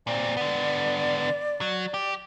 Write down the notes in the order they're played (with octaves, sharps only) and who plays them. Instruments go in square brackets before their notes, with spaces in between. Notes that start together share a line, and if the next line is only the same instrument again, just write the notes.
[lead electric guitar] A#2 C4 [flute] D5
[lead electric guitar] D3 B3
F#3
G4